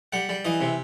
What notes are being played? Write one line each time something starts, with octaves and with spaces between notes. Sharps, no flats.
G3 F#5
G3
E3 D#5
C3